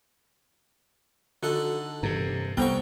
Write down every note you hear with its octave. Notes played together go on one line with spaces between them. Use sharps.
D3 D#4 F#4 A4
G2 C3 E3
C2 B3 A4 C5 F#5 G5 A#5 C#6